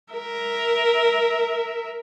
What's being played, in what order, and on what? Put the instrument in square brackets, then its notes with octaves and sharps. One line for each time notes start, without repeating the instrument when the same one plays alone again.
[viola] A#4 E5